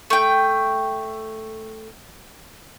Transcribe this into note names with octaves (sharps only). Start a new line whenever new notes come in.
A3 G5